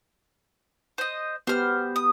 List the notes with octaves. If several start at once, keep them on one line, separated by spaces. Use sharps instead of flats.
C5 D#5
B3 G4 B4 C5 F6
D#6